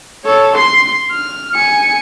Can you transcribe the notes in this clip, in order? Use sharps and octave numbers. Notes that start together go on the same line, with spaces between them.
A4 C#5
C6 C7
F6
G#5 C#7